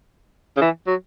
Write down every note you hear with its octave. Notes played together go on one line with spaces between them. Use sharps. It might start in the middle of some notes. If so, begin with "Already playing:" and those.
C#3
E3
F#3